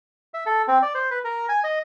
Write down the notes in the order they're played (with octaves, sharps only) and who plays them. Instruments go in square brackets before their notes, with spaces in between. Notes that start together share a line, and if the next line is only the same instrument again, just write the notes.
[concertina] E5
A4
C4
D5
C5
B4
A#4
G#5
D#5